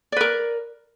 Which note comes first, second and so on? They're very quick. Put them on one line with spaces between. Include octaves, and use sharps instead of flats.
D5 B4 A#4